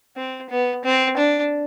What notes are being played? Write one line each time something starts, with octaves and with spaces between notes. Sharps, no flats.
C4
B3
C4
D4